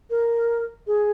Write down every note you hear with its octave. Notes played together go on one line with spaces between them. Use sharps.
A#4
G#4